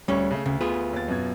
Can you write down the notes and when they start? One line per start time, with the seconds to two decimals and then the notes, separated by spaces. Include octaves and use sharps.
0.08 D2 G3 C#4 C#5 C#6
0.31 C#3 A3
0.46 D2 C#3
0.61 B3 F4 G#4
0.93 D#2 A6
1.08 F#2 B2 G#6